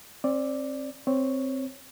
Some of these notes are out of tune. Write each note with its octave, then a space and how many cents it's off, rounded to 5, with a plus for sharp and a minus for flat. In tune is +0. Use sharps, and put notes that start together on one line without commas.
C4 +30 D5 +0
C4 +0 C#5 +0